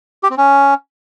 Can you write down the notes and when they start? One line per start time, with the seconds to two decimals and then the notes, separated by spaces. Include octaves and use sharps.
0.23 G4
0.30 C4
0.38 C#4